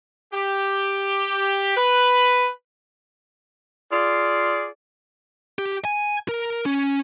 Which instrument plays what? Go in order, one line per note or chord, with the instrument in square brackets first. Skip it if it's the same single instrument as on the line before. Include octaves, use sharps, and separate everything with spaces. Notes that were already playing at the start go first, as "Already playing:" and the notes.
[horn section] G4
B4
[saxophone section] F4 G#4 D5
[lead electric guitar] G4
G#5
A#4
C#4